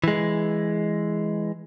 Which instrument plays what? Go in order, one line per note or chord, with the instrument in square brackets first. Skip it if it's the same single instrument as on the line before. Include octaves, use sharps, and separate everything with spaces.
[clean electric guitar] E3 G#3